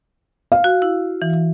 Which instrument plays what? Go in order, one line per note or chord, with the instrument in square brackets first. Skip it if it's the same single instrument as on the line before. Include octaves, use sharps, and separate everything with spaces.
[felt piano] F5
[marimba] F#4
E4
E3